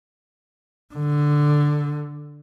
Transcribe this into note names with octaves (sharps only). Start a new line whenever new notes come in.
D3